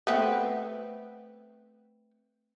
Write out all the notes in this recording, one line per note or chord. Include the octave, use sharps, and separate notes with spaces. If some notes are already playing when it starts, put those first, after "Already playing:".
A3 B3 C4